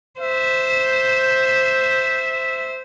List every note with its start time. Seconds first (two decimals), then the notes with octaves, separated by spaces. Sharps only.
0.21 C5 E5